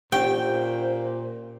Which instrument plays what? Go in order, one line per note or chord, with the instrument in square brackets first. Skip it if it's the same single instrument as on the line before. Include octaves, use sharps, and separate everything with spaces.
[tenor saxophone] A#2 [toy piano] C#4 D4 G4 [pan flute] C5 [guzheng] G5